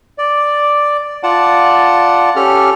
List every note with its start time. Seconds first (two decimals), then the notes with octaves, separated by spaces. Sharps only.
0.18 D5
1.23 F4 D5 F#5 A5
2.36 C#4 G4 A4 F6